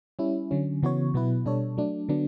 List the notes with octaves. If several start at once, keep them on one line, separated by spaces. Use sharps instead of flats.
G3 C#4 E4
D3 F#3 C#4
C#3 E3 B3 F#4 C#5
B2 F#3 B3 E4 B4
B2 G3 D4 A4 C#5
F#3 A3 D4
D3 F#3 B3 D4